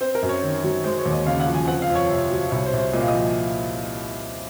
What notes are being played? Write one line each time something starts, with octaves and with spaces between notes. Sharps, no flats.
C4 C5
A#4
F#2
C#5
D#3
F#3
G#3 C5
C#5
D#2
D#5
C#3 F5
F#5
F3
G#5
C4 F#5
F5
F2
C#5
C3
F#3
C2 C#5
C5
C2
C5
A#2 D#5
F5
D#5
F3